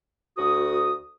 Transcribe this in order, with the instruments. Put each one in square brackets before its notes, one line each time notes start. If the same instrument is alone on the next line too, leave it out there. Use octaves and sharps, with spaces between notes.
[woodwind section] D2 F#4 D#6